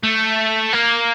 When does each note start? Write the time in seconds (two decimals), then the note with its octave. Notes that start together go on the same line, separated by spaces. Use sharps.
0.03 A3
0.73 A#3